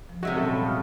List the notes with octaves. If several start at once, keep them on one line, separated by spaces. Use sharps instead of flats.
F3
C3 F#3 G#3 F#4 D#5 E5
A#2 G3 C#4 A4
F5 B5
D#6 F6